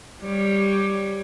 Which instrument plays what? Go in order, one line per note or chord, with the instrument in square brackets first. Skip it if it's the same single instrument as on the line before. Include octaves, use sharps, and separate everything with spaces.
[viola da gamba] G3 C#5